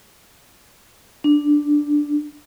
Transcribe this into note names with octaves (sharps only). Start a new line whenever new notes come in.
D4